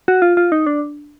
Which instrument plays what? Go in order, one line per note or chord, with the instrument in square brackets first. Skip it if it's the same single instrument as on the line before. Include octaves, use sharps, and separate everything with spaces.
[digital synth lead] F#4
F4
F4
D#4
D4